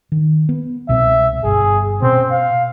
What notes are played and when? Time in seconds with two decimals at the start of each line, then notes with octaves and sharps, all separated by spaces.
0.12 D#3
0.49 B3
0.89 C2 B2 C4 E5
1.44 G1 G#4
2.02 B2 C4 C#4
2.31 F5